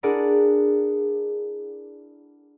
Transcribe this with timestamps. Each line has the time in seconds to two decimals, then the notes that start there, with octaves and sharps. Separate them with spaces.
0.03 D4 E4 G#4 A#4 D5 F#5